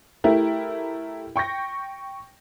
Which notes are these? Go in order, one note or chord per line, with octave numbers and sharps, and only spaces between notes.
A3 E4 G4 A#4
G5 C#6 G6 A#6